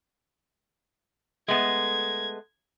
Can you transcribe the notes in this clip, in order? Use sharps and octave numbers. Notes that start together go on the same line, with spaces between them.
G#3 A3 B3 G#6